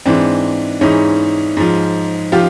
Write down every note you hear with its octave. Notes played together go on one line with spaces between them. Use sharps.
G#2 E3 C4 D4
G#2 E3 C#4 D#4
G#2 F3
F3 F4 G4